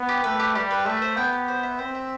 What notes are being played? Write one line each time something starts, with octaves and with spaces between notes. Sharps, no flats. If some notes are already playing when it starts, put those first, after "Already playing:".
Already playing: B3
G4
A3 B4
G4
G3 G4
B4
A3 E5
C5
B3 G5
G4
C5
E5
C4 C5
E5